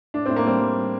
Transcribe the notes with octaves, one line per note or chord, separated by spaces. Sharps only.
A2 D4
A2 C4
A#3
G3 C4
G3
G3